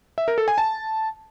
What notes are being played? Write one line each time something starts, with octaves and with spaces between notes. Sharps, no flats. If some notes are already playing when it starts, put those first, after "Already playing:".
E5
A#4
A4
G#5
A5